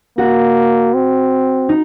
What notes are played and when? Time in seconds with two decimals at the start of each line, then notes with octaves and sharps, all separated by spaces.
0.18 A#3 F#4
0.94 C4
1.69 D#4